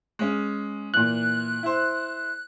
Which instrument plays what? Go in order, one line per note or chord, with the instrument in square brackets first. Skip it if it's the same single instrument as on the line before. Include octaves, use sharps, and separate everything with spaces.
[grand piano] G#3 C#4
[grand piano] A#2 E3 [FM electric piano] F#6
[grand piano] E4 C5